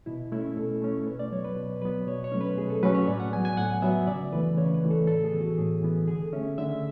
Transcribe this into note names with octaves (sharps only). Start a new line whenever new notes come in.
B2 E4
A3 C#4 E4
B2 A4
A3 C#4
B2 B4
D5
F#3 B3 C#5
B4
B2
F#3 B3 B4
B2 C#5
C#5
F#3 A3 C#4
B4
B2 G#4
A4
F#3 A3 C#4 B4
C#5
A2 D5
F#5
F#3 B3 G#5
G#5
A2 F#5
F#3 B3 E5
C#3 D5
E3 A3 B4
C#3 C#5
B4
E3 A3
A4
A2 A4
G#4
E3 B3
F#4
A2 G#4
E3 B3
D3 G#4
A4
A3 C#4 E5
D3 E5